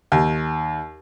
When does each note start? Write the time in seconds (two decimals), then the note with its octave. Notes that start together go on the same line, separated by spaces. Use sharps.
0.12 D#2